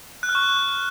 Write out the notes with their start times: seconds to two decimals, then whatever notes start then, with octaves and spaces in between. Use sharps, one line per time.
0.23 F#6
0.29 F6
0.35 C#6